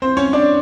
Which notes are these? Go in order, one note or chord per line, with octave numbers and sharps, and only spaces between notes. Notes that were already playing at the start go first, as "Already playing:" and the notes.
C4 C5
C#4 C#5
D4 D5